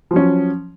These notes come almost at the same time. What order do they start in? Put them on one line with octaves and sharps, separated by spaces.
F3 F#3 C#4